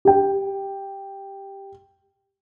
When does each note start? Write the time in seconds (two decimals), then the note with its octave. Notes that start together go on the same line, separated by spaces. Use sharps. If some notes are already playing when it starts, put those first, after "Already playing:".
0.05 G4 G5